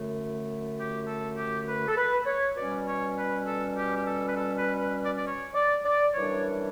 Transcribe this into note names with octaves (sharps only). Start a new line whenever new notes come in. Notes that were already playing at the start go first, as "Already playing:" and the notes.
Already playing: F#2 D3 A3
G4
A4
G4
B4
A4
B4
C#5
B2 G3 C#4 D5
C#5
B4
A4
G4
G4
A4
B4
A4
B4
B4
D5
D5
C#5
D5
D5
F#2 E3 G3 D4 C#5